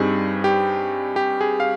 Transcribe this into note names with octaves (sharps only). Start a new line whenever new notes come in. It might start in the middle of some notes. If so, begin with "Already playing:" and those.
Already playing: G2 G3 C4 D#4 G#4
G4
G4
G#4
F5